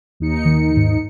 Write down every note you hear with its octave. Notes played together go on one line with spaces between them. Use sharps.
D#2 D#4 C#7
D#3
G#2